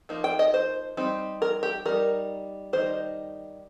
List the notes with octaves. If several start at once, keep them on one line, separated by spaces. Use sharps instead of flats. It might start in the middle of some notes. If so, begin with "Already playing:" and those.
F3 A#3 D#4
G5
D#5
C5
G3 C4 D#4
A#4
G4
G3 D#4 A#4
D#3 G3 D#4 C5